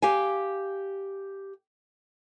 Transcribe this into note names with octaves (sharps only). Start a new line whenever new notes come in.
G4 F5 G#5